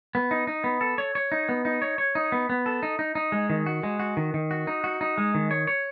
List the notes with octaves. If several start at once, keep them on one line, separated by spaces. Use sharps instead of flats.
B3
D#4
D#4
B3
A4
C#5
C#5
D#4
B3
D#4
C#5
C#5
D#4
B3
B3
A4
D#4
D#4
D#4
G#3
D#3
F#4
G#3
F#4
D#3
D#3
F#4
D#4
F#4
D#4
G#3
D#3
C#5
C#5